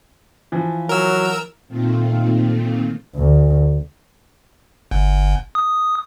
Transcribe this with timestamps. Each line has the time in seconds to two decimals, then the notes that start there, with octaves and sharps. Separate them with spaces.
0.52 E3 F3
0.89 F#3 A#4 E6
1.68 A#2 D#3 A3 C4 F4
3.15 D2
4.91 G1
5.55 D#6